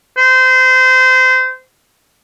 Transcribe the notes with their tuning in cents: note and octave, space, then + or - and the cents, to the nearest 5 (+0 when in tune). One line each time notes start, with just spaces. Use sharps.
C5 -25